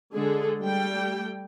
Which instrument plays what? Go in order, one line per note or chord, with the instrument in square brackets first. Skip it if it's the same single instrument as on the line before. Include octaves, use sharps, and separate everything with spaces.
[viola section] D3 G#3 G#4 A4
G3 A3 G5